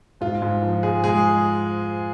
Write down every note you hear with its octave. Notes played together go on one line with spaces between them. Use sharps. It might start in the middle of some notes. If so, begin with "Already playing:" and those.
G#2 F4
G#2
F3
G#3 G#4
G#3 G#4